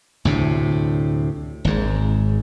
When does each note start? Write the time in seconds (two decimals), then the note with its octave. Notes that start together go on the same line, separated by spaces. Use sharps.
0.25 D2 A2 C3
1.65 G#1 G#2